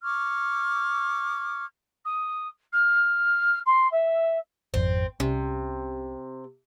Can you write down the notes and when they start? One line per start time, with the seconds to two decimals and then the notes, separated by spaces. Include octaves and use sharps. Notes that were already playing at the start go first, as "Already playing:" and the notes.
0.04 C#6 D6 F6 G#6
2.04 D#6
2.72 F6
3.66 C6
3.91 E5
4.74 G#1 F2 C4
5.20 C2 C3 C#4